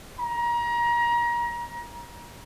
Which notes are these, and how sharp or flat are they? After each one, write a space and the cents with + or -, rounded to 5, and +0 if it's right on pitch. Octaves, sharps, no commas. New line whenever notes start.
A#5 +30